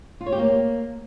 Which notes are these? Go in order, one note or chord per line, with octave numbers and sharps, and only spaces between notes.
F4
C#5
G4
A#3